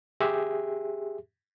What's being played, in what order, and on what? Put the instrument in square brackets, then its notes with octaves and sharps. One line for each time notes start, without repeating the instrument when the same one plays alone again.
[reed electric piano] G4 G#4 E5